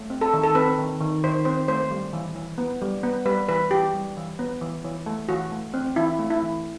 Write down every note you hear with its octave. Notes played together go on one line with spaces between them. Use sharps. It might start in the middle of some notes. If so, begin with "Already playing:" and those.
Already playing: A3
C4
A4
D#3
A4
C4 B4
D#3
D#3
D#3 C5
C4 C5
A3 C5
G3
E3
E3
B3
G3
B3
G3 B4
E3 B4
E3 G4
G3
E3
B3
E3
E3
A3
E3 F#4
A3
C4
E3 E4
A3
E4
E3